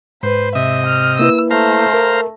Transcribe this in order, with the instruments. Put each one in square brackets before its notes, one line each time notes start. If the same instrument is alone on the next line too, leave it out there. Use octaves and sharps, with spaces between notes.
[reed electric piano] G#2 [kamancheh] B4 [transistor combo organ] C5
[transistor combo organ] C3 D#5 [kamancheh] E5
[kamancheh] F6
[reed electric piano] A#3 E4 B4 [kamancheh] E6
[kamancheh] A3 [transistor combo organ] C5 F5 A#5
[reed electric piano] A#4